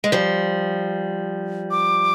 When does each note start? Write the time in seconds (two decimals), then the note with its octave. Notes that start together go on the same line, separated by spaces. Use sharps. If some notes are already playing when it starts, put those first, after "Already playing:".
0.04 G#3
0.12 F3 G3
1.71 D6